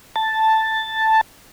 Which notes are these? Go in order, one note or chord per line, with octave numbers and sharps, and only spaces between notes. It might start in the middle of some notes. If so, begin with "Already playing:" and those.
A5